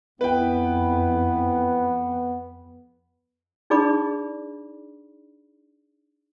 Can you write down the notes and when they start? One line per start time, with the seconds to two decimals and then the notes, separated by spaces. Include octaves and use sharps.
0.21 F2 B3 E4 B4 G5
3.70 D4 D#4 G#4 D5 B5 D6